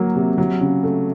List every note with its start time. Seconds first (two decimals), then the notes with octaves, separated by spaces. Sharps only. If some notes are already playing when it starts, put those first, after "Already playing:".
Already playing: F#3 A#3
0.16 C3
0.38 F#3
0.61 C#3
0.83 A3